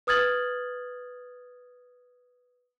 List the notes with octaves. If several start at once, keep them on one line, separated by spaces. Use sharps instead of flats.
B4 D#6 F6 G#6 A6 F#7